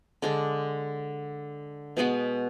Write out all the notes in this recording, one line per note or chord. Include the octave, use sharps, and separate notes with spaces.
D3 G#3 D4
B2 G#3 B3 F#4